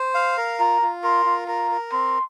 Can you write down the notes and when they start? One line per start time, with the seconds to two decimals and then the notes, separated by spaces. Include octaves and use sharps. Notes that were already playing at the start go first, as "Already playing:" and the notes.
Already playing: C5
0.14 F5
0.38 A#4
0.59 F4 A#5
0.82 F4
1.03 A#4 C6
1.26 F4
1.48 A#4 A#5
1.71 A#4
1.92 C4 C6